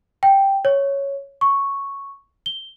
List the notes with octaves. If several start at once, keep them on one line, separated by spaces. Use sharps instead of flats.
G5
C#5
C#6
G7